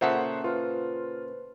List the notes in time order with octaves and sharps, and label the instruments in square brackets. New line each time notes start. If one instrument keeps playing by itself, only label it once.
[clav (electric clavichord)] A#2 C#3 A4 [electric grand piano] C5 E5 F#5
[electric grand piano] F4 [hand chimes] B4 C5